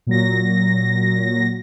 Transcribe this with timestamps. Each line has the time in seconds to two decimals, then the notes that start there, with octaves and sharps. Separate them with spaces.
0.07 A#2 F#3 A#6